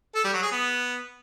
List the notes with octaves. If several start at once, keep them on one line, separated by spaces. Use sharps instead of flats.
A4
G3
F#3
G#4
B3